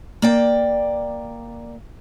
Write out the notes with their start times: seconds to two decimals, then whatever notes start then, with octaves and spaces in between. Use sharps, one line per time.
0.22 A#3 D5 G5